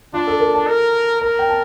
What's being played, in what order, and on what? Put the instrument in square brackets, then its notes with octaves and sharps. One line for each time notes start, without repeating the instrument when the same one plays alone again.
[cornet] D4 [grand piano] F4
[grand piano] A4
A#4
A5
[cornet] A#4
[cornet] A#4 [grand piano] A#5
[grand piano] G5
A5